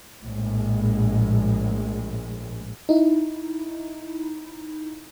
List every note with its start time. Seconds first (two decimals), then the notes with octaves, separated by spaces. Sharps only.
0.23 A#1 A2 G#3
2.89 D#4 E4